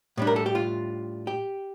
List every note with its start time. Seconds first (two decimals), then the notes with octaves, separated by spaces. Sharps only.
0.17 A2 G3 D4
0.27 A#4
0.36 A4
0.46 G4
0.55 F4
1.27 G4